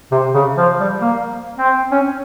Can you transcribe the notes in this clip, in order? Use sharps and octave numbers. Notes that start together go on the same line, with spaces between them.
C3
C#3
F3
G3
A#3
C4
C#4